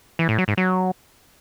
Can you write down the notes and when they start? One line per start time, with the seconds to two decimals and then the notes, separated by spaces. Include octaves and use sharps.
0.19 E3
0.29 A2
0.38 F#3
0.48 G#2
0.57 F#3